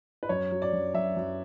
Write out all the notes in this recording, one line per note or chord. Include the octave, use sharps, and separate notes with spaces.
B4
F#2 C#5
F#3
D5
F#2
F#2 E5
F#2